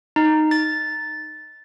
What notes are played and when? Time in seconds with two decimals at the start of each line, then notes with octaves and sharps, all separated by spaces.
0.16 D#4
0.51 A6